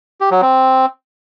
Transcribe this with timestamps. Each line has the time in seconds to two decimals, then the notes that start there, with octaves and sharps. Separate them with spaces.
0.21 G4
0.31 F#3
0.42 C4